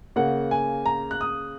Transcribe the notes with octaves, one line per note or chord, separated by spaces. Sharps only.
C#3 A#3 F#5
G#5
A#5
F#6
D#6